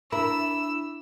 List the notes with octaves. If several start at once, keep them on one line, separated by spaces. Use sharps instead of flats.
D4 E4 A#4 A5 B5 E6